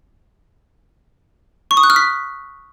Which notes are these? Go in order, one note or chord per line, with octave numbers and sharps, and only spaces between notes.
C#6
D#6
F#6
F6
B6